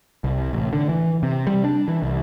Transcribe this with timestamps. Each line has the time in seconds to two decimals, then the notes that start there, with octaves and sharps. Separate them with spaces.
0.24 C2
0.53 A1
0.73 D3
0.89 E3
1.23 C3
1.47 G3
1.65 D4
1.88 E3
2.02 C2